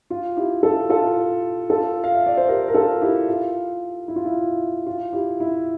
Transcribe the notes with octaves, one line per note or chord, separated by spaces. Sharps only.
F4
E4 G4
F4 A4
F4 A4
F4 A4
F5
E5
D5
C5
G4 A#4
A#4
F4 A4
E4 G4
F4
E4
F4
E4
F4
E4 G4
E4